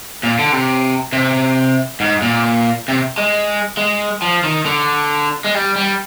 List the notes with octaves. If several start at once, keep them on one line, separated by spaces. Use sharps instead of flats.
A#2
D3
C3
C3
G#2
A#2
C3
G#3
G#3
F3
D#3
D3
G#3
G3
G3